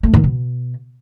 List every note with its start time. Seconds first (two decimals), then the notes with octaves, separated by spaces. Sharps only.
0.03 A3
0.14 D#3
0.24 B2